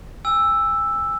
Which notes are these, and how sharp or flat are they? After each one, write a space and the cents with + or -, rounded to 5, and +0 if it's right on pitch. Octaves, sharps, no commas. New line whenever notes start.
G#5 -30 E6 +0